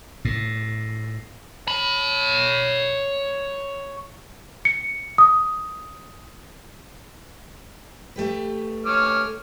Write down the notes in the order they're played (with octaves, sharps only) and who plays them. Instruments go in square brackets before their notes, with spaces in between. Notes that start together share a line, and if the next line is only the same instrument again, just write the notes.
[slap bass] A2
[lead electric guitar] C#5 B5
[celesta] C#7
D#6
[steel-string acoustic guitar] A3 G4 B4
[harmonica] C#5 D6 F6